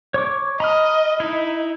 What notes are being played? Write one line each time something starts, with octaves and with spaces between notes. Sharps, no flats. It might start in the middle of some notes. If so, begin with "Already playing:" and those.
C#5 C#6 D6
D#5 A#5 B5 F6
D#4 E4